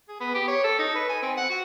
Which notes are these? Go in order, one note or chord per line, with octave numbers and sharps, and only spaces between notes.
G#4
B3
G4
C#5
A4
D#4
B4
G#5
C4
F#5
F#4